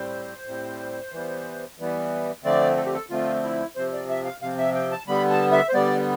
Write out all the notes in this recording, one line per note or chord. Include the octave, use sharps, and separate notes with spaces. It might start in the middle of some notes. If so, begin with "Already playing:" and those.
Already playing: A2 G3 C4 C5
A2 G3 C4
E3 G3 B3
E3 G3 B3
D3 F3 A3 C4 D5
A4
G4
A4
D3 F3 A3 C4 F4
E4
C3 F3 C4 C5
D5
E5
F5
C3 F3 C4 F5
E5
G5
A5
D3 G3 B3 B5
A5
E5
C5
D3 G3 B3 D5